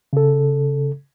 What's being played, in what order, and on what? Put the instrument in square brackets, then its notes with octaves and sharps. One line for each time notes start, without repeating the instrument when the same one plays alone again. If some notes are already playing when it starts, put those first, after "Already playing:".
[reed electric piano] C#3 A4